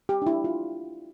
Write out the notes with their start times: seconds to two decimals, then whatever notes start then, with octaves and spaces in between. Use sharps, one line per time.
0.09 G4
0.22 D4
0.26 E4
0.44 F4